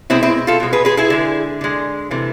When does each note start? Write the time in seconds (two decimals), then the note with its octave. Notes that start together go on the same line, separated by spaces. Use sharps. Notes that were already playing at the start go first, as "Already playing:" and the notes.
0.10 B2 G#3 C4 E4
0.23 C4 E4
0.47 F4 A4
0.60 B2 G#3
0.73 G#4 B4
0.85 G#4 B4
0.97 E4 G#4
1.10 D3 G#3
1.61 D3 G#3
2.11 C3 E3 A3